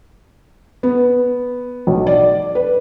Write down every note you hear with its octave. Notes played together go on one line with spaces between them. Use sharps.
B3
B1
D5
B4